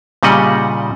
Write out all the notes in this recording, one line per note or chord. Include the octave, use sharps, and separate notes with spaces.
A#2 C#3 G3 D#5 F#5